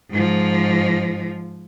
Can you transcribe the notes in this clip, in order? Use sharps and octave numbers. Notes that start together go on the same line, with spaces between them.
G#2 F3